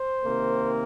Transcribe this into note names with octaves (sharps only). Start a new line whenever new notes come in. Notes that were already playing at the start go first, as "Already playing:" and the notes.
Already playing: C5
C3 D#3 A#3